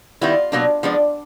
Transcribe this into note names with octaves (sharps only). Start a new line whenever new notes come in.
D#3 G3 B3 E4 F4
B2 F#3 A#3 D4
F3 G#3 B3 D4